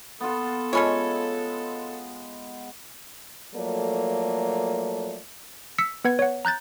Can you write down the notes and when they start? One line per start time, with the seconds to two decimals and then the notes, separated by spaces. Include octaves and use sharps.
0.21 B3 F4 A4
0.73 G#3 A3 C#4 F4 C#5 B5 C#7
3.55 F3 F#3 A3 A#3 A4 D5
5.78 E6 B6 C#7
6.04 B3 B4 F#5 G#6
6.19 C#5 F#5
6.45 A#5 F#6 G6 A6